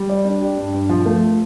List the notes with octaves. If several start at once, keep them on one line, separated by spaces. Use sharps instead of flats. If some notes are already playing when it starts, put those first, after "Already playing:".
Already playing: G3
D5
D4
G4
G2
G2
F3
A3